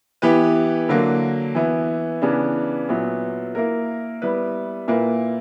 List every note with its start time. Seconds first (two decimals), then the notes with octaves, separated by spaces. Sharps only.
0.22 E3 B3 E4 G4 B4
0.89 D3 F#3 A#3
1.55 E3 B3 E4
2.22 C#3 E3 B3 D4
2.89 A#2 F#3 B3 E4
3.55 A#3 E4 A#4
4.22 G3 B3 E4 B4
4.88 A#2 A#3 E4 B4